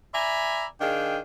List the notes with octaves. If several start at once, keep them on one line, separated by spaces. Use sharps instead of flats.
D5 E5 G#5 A#5 B5
D#3 D4 G#4 F5 G5